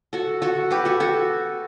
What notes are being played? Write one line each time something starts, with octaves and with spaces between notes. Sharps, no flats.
F#4 A4
F#4 A4
G4 B4
F#4 A4
F#4 A4